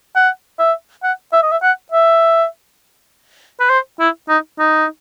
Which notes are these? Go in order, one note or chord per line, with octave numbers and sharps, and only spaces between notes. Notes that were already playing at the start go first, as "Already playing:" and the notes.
F#5
E5
F#5
E5
D#5
E5
F#5
E5
B4
C5
E4
D#4
D#4